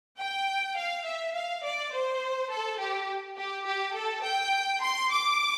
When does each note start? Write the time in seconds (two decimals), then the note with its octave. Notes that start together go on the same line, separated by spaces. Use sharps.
0.18 G5
0.76 F5
1.05 E5
1.34 F5
1.63 D5
1.92 C5
2.50 A4
2.79 G4
3.37 G4
3.66 G4
3.95 A4
4.24 G5
4.82 C6
5.11 D6